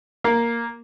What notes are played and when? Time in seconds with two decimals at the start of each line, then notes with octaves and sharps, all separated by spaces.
0.24 A#3